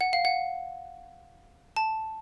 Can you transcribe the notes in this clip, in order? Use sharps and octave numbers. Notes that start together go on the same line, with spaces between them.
F#5
F5
F#5
A5